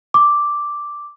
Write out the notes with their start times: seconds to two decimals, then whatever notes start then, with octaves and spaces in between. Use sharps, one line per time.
0.14 D6